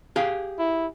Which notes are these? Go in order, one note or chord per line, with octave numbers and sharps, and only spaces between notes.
G4 G#4 F5
E4